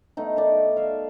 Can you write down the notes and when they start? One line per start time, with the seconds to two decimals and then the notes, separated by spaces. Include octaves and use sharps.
0.17 A3 B3 D#4
0.37 D#3 D5
0.76 E5 F5